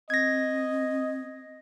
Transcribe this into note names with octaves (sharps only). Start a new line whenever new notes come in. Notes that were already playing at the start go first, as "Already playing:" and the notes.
C4 D#5 G#6 A#6